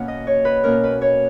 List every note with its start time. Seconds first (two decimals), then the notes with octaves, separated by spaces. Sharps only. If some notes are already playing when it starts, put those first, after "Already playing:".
Already playing: B2 A#3 C#4 F#5
0.08 D#5
0.27 C#5
0.45 B4
0.64 B2 A#3 C#4 A#4
0.84 B4
1.01 C#5